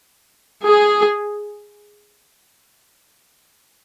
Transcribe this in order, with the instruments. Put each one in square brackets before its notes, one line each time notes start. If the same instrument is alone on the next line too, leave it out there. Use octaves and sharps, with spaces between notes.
[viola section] G#4